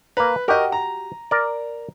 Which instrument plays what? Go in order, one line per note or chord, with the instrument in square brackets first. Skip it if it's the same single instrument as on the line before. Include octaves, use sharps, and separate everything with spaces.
[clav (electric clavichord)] A#3 A#5 [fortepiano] B4
[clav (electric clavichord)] F#4 G4 [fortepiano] A#4 D#5
[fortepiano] A#5
[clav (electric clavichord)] A#4 D5